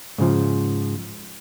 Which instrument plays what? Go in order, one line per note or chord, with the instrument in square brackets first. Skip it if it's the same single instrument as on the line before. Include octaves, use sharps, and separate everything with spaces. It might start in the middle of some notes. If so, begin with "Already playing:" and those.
[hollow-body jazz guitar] G#2 C#3 F3